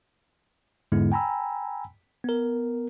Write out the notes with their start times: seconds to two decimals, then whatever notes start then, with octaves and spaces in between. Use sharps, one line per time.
0.92 E2 G#2 D3 G#3 B3 E4
1.12 G5 G#5 A#5 B5 E6
2.24 B3 A#4